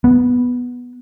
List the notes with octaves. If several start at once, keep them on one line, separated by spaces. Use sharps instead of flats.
B3